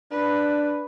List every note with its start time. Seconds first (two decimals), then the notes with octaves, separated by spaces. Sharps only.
0.12 D4 B4